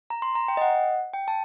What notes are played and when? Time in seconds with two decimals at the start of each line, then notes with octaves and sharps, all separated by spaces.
0.10 A#5
0.22 C6
0.35 A#5
0.48 G5
0.57 D#5
0.61 F#5
1.13 G5
1.28 A5